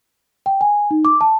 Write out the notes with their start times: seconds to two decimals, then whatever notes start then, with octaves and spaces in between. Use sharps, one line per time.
0.46 G5
0.61 G#5
0.91 D#4
1.05 D6
1.21 A5